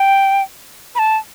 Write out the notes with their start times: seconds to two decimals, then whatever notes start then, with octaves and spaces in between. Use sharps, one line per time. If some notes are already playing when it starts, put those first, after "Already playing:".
Already playing: G5
0.95 B5
0.99 A5